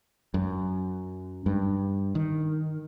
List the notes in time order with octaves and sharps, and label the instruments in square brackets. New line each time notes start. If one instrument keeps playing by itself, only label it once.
[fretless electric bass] F#2
G2
D#3